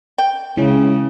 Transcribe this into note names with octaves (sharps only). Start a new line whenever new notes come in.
G5
C#3 G#3 C#4 E4